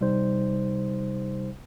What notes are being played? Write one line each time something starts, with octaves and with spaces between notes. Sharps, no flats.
C3 G3 D#4 C5